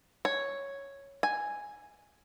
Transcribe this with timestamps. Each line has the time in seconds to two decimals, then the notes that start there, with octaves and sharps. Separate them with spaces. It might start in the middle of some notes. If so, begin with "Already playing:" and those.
0.25 C#5
1.23 G#5